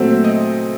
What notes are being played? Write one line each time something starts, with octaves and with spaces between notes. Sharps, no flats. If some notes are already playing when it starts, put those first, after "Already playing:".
Already playing: A#2 F#3 A3 C4
D#5